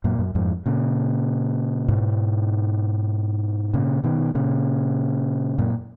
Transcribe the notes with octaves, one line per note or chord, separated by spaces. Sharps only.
F#2 A#2
F#2
F2 G#2
A#2 C#3
G#2 B2
A#2 C#3
B2 D#3
A#2 C#3
F#2 A#2